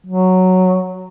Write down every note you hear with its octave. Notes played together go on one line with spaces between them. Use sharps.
F#3